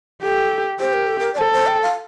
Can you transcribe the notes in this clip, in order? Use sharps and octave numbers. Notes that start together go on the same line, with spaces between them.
G4 A4
G4 C5
A#4
A4
A#4
D5
A4 C5
C5
G5
F5